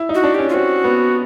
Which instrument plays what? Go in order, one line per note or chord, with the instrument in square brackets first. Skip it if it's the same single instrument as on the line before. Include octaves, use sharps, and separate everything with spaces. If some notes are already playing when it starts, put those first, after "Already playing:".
Already playing: [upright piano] E4
D#4
[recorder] F#4
[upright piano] D4
[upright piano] C#4 [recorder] G4
[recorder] F4
[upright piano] C4 [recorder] F#4
[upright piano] B3